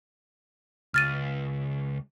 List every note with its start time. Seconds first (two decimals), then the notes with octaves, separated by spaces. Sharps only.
0.94 C#2 F6 A6 D#7